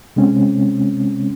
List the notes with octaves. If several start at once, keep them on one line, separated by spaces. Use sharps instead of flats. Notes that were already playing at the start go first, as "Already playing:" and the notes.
C3 G#3 C4 C#4